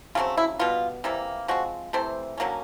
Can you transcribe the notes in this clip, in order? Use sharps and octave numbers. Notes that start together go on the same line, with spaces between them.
C#3 F#3 A3 C4 F4
E4
B2 G3 B3 F4
C3 E3 G3 A#3
F3 G#3 C4 F#4
C3 E3 A3 C4 C5
D3 F#3 A#3 C#4